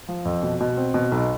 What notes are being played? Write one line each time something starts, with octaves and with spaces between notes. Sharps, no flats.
F3
F2
B2
B2
C4
B2
B1